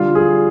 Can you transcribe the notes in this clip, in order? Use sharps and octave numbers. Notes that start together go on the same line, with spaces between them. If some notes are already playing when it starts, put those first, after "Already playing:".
Already playing: D3 G3 F4
G#4